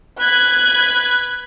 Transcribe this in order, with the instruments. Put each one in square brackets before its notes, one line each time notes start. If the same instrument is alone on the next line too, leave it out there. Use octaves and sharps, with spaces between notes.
[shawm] B4 [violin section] F#6 G#6